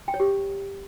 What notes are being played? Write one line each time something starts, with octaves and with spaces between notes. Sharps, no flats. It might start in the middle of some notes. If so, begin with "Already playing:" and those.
G5
C#5
G4